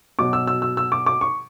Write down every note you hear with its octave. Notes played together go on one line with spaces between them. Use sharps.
B2 F#3 D6
E6
E6
E6
E6
D6
D6
C#6